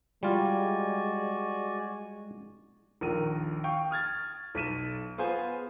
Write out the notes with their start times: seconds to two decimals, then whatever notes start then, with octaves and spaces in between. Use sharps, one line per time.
0.23 G3 G#3 F4 F#4 D5 G#5
3.01 A#1 D#2 A#4 D#7
3.64 F5 G5 C#6
3.91 D#6 F6 G#6 A6
4.55 B1 B6 D#7 E7
5.18 B3 F4 G#4 C5 G#5